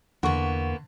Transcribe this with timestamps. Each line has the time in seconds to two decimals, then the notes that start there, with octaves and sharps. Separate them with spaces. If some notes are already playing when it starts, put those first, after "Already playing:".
0.23 E2 D3 A#3 B3 F#5 C#6